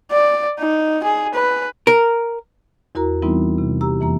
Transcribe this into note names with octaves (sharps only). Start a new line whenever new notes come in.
D5
D#4
G#4
B4
A#4
E2 E4 F#4 A#4 A#5
E3 G3 B3 C4 D#4 E4
C3
G4 A#5 E6
F2 E3 A#3 A#5